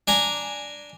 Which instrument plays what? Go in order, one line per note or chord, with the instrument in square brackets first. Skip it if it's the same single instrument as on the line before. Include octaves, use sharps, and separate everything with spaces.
[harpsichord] D4 G#5 A#5